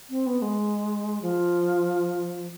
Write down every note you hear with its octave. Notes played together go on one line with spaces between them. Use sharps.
C4
B3
G#3
F3